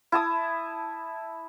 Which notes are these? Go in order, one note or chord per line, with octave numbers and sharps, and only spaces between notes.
E4 A5 D#6